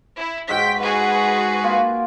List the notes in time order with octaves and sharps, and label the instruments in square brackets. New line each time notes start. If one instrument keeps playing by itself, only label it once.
[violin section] E4
[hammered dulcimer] G#2 G#3 F#4 [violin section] G5 B6
[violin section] F#4 G#4 B4 [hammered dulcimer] F#5
[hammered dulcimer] A#3 F4